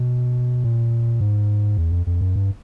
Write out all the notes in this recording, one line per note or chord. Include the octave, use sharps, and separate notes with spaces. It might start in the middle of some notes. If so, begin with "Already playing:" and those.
Already playing: B2
A#2
G#2
E2
F2
F2
F#2
G2